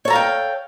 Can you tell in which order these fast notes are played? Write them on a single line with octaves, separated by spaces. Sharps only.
C#5 A4 A#5 F5 G5